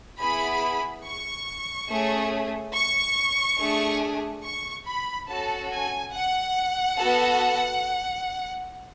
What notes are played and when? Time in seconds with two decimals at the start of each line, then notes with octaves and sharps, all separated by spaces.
0.20 B3 E4 G#4 B5
1.05 C#6
1.90 A3 C#4 G#4
2.74 C#6
3.59 A3 D4 G#4
4.43 C#6
4.85 B5
5.28 C#4 F#4 A4 A5
5.71 G#5
6.13 F#5
6.98 B3 F#4 A4